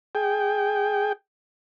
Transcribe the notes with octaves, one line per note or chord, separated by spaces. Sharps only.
G#4 G5